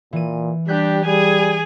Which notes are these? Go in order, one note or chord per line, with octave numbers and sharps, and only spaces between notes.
A#2 E3 D#7
G3 D4 G4 F#6 G6 B6
G3 G#4 G#5